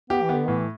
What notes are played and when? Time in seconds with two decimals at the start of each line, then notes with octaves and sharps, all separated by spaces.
0.10 B3 G4
0.23 E3
0.29 B3
0.35 D3
0.48 A2 E3